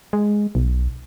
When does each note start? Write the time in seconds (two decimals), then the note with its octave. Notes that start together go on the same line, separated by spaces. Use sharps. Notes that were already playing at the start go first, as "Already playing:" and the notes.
0.13 G#3
0.55 B1